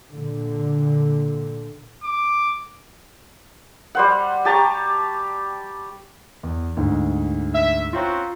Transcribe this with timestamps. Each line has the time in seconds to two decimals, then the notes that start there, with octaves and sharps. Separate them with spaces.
0.13 A#2 D3
2.04 D6
3.95 G3 C5 F#5
4.45 G4 A5 A#5 C#6
6.43 E2
6.77 D2 G#2
7.54 E5
7.93 C4 C#4 F4 F#4 A#5